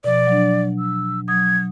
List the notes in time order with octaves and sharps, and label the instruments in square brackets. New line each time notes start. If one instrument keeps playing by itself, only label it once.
[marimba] B2 F3 [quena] D5
[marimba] F#3 D4
[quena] E6
[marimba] F#3 D#6 [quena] G#6